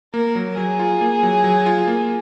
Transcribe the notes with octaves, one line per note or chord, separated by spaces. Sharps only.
A#3 A#4
F#3
F#3 G#4
F4
A#3
F#3
F#3
F4
A#3